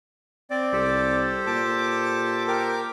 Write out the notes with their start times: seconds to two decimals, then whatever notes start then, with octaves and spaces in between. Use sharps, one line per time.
0.50 C4 D5
0.72 C2 G4 A4 C5
1.47 A#2 A5 D6
2.48 A#4 G5 D6